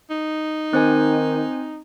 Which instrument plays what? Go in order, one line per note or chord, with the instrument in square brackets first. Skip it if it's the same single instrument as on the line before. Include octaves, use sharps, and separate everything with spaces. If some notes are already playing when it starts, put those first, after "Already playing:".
[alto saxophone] D#4
[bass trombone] D#3 [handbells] C4 C5 G#5